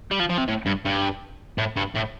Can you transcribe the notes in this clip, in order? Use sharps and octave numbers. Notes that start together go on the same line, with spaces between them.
G3
F3
F3
C3
A2
G2
G2
A2
G2
A2